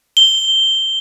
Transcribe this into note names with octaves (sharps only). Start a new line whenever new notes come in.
G7